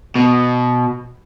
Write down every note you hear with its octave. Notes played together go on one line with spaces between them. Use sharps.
B2